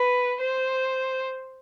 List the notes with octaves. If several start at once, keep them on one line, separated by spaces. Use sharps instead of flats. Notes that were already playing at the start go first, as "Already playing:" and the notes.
Already playing: B4
C5